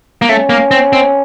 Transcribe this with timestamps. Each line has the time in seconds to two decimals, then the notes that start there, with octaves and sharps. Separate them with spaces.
0.22 A#3
0.29 A3 C#4
0.50 A#3
0.71 C4
0.93 C4